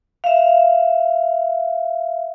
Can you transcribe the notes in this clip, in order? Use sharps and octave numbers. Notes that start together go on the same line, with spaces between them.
E5 F5